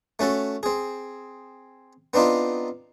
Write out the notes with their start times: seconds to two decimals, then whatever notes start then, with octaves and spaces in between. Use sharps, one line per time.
0.19 A3 C#4 F#4 A4
0.63 C4 G#4
2.14 B3 C4 D4 D#4 F4